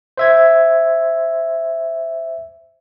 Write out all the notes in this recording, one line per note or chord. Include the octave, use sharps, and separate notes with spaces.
C5 E5 G#6